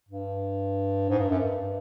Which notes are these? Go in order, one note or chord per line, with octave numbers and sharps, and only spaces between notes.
G2
G#2
G2
F#2
G2